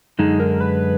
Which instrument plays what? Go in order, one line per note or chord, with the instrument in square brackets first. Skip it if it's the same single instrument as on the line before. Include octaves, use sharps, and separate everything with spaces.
[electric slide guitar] F#2 D3 G#3 [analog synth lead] D#4
[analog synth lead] A#4
B4